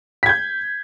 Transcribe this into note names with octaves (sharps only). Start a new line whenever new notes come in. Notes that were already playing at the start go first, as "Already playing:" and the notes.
G6 G#6 B6